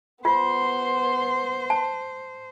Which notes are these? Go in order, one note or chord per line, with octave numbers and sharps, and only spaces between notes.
B3 F4 C5 C6
A5